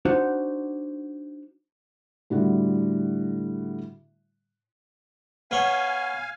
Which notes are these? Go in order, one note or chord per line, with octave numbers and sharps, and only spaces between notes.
D4 D#4 F#4 C5 F#5
A2 D3 G3 E4 F#4
B3 C#5 F5 G#5